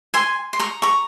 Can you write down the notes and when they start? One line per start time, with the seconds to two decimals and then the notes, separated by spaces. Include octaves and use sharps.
0.14 G#5 C6
0.53 C6
0.59 A#5 C#6
0.82 A#5 C#6